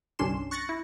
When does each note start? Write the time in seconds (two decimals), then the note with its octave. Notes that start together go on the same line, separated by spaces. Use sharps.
0.19 G1 C2 C#4 D4 C6 E7
0.51 C#6 F#6 A6 A#6 C#7
0.69 E4